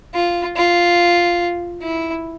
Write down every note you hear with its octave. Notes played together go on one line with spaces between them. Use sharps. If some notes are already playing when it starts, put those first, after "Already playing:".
F4
F4
E4